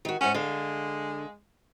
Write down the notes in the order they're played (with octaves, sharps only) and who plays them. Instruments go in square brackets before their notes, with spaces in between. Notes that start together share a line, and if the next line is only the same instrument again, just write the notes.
[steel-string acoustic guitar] D#3 F#4
[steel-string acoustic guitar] G#2 F#5 [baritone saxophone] C#4
[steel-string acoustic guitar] D3 F5 [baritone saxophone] G#3